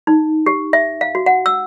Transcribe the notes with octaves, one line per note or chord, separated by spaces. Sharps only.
D#4
G4
E5
F5
F#4
F#5
E6